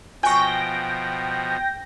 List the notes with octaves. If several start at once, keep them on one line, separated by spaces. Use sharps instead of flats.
B2 F3 F#4 G5 G#5 C#6 A#6